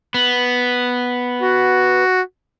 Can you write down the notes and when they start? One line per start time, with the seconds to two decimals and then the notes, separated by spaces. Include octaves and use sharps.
0.14 B3
1.42 F#4